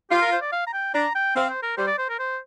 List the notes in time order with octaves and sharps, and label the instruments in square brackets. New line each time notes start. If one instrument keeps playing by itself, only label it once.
[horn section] F4 [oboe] G4
[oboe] A#4
C5
D5
F5
A#5
G5
[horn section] D4 [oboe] A#5
[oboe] G5
[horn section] C4 [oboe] F5
[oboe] C5
A#4
[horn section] G3 [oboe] C5
[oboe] D5
C5
A#4
C5